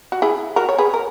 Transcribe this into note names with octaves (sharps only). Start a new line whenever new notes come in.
F#4
E4 G#4
F#4 A#4
C#5
G#4 B4
A#4